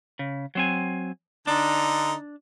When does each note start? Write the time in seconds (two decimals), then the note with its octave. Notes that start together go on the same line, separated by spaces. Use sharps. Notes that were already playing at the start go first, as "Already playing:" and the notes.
0.19 C#3
0.55 F#3 C4 G#5
1.47 D3 D4 D#4